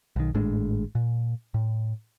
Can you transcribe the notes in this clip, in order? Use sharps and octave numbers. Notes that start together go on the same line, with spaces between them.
B1 D#3
G#1 A2 G#3 D4
A#2
A2